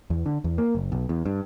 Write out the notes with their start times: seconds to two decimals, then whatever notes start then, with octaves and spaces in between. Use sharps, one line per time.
0.10 E2
0.26 D3
0.44 E2
0.58 A#3
0.75 F#1
0.92 B1
1.09 E2
1.26 G2